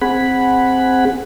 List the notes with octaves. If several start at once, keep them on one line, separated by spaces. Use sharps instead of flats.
C4 G#4 F#5 B5